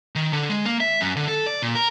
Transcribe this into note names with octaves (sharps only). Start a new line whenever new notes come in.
D#3
D3
G#3
A#3
E5
F#2
D3
A4
D5
A#2
A#4